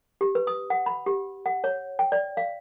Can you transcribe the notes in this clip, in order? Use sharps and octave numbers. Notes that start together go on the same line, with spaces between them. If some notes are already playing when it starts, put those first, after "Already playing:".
G4
B4
D#6
F#5
B5
G4
F#5
C#5
G5
D5
F5